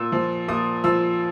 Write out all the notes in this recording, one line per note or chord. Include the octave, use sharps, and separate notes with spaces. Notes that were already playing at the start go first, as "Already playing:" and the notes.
Already playing: A#2 E6
F3
A#2 D#6
F3 E6